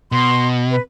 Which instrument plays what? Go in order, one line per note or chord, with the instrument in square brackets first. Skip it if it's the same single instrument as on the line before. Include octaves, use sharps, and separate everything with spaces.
[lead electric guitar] B2 [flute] C6
[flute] B4